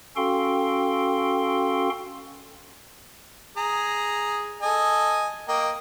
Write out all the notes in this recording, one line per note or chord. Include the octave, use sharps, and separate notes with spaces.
C#4 F#4 A4 F5 G5 C6
G#4 A#5
A4 D#5 G#5
A#3 D#5 G5